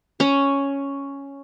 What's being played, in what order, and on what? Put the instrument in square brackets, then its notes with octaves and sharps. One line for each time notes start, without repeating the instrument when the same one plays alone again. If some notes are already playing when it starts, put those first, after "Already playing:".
[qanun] C#4